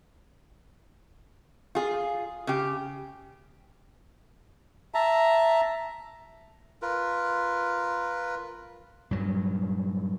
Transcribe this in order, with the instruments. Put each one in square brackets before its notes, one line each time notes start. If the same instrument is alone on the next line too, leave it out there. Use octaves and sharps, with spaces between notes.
[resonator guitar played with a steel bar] F4 G#4
C#3 G4
[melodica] E5 A5 A#5
F4 A#4 B4
[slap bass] G2 A#2 F#3